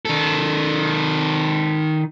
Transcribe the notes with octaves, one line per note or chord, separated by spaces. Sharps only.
D#3 A4